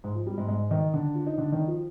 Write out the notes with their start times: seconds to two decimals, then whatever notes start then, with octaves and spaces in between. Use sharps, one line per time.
0.04 G#2 G#3
0.15 F3
0.27 G3
0.38 G#2 G#3
0.48 G#2 G#3
0.71 D#3 D#4
0.93 D3 D4
1.15 F4
1.26 D#4
1.38 D3 D4
1.52 D#3 D#4
1.68 F3 F4